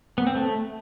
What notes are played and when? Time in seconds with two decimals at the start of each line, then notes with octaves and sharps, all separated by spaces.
0.18 B3
0.27 C4
0.35 A3